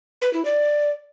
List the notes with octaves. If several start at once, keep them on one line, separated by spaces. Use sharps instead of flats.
B4
E4
D5